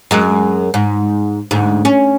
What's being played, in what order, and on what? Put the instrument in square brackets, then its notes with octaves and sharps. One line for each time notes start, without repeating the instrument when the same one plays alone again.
[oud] F#2 G#3
G#2
D2 G#2
C#4